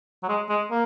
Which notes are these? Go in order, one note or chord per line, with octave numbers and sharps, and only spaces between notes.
F#3
G#3
G#3
A#3